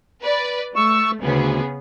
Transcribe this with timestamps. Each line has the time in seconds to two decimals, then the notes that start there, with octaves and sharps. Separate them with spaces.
0.22 B4 D5
0.76 A3 C#6 E6
1.21 D2 C#3 B3 G#4